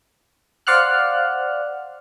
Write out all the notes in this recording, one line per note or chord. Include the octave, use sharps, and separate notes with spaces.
C5 D5 F5 F#5 F6 F#6